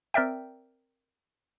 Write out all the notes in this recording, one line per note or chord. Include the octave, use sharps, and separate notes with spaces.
C4 A#4 D5 E5 G5